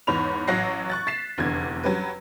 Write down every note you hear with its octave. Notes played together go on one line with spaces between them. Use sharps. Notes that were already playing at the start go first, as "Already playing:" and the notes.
E2 G#2 C#5 B5 F7
A1 F#3 C#5 F#6 A#6 C7
C#6 F#6 A6
A6 B6 C7 E7
F1 E2 D3 G#6
F#3 G3 C#4 B4